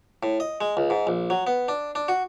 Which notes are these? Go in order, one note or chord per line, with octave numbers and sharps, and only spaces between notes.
A2
D#5
G#3
C#2
G#2
A#1
F#3
B3
D4
D4
F#4